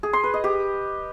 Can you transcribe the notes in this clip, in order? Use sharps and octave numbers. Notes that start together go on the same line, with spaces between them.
G#4
C6
B4
D#5
G4